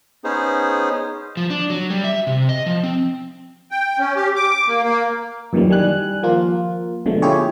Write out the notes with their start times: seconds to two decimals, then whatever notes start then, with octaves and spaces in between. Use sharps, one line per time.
0.24 B3 C#4 D#4 G#4 C5
1.37 F3
1.50 D4
1.70 F#3
1.90 G3
2.04 E5
2.27 C3
2.49 D#5
2.66 F3
2.83 C4
3.71 G5
3.99 C#4
4.16 G4
4.36 D6
4.68 A#3
4.83 A#3
5.53 F#2 A#2 D#3 E3 F#3 G3
5.69 D#3 G3 G#5 F#6
6.23 F3 A#3 F4
7.06 B2 D3 F3 G#3 A3
7.22 E4 F4 G4 G#4 C#5